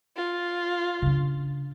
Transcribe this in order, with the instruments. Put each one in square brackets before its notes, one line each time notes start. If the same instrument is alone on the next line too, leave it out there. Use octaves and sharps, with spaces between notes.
[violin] F4
[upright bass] C#3 D4